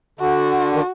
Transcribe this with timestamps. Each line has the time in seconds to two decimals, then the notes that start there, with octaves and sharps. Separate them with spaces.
0.19 D3 F#4
0.73 D#3